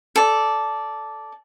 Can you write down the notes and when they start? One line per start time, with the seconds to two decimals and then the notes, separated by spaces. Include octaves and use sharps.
0.16 A4 D5